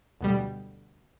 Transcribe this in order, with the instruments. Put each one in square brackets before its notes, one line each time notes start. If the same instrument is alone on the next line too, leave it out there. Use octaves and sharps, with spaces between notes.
[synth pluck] D2 B2 G3